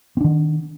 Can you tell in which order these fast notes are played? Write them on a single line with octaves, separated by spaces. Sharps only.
C4 D4 D#3